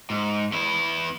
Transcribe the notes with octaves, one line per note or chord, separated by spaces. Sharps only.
G#2
E2 E4